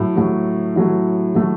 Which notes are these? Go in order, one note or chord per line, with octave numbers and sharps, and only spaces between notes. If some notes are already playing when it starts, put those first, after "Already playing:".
Already playing: A2 F#3 A3
A2 F#3 A3
A2 F#3 A3
A2 F#3 A3